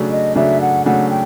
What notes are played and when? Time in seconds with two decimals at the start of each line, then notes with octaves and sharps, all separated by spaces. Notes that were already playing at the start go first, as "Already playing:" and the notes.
Already playing: C#3 F#3 A3 D4
0.11 D#5
0.35 C#3 F#3 A3 D4 E5
0.61 F#5
0.86 C#3 F#3 A3 D4 F#5
1.10 G5